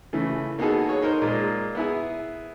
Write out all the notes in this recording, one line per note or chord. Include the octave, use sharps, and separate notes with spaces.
C#3 E3 A3
A#3 B3 D#4 F#4 G#4 A4
G#4 C#5
D#4 A#4 C5
A#2 G#3
B3 E4 G#4